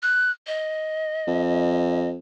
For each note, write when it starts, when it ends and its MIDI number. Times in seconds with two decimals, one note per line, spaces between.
0.03 0.31 90
0.47 2.09 75
1.27 2.18 41